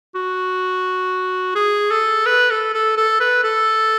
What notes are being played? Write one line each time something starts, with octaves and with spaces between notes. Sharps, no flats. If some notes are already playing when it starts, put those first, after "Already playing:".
F#4
G#4
A4
B4
A4
A4
A4
B4
A4